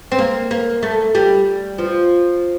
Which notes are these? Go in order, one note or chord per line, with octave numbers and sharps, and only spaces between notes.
C4
A#3
A#3
A3
G3
F3